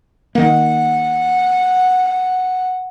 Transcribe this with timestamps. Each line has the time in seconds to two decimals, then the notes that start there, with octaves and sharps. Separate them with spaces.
0.35 D#3 A#3 F#5